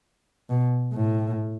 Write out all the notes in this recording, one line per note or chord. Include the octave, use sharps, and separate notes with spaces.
B2
A2